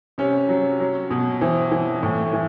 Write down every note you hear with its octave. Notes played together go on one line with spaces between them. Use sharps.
C3 C#4
F#3
F#3
B2
E3 C4
E3
A2
E3